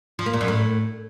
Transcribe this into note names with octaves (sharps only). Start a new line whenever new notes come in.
F3
A#3
A#2
F#2
A2